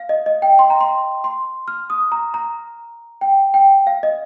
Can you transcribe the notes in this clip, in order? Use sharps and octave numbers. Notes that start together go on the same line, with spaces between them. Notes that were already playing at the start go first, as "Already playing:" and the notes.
Already playing: F5
D#5
D#5
G5
C6
A#5
C6
C6
F6
D#6
A#5
A#5
G5
G5
F5
D#5